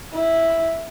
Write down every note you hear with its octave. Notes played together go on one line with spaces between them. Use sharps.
E4